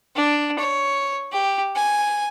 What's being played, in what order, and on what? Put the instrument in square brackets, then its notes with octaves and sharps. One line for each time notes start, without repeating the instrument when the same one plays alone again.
[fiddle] D4
C#5
G4
G#5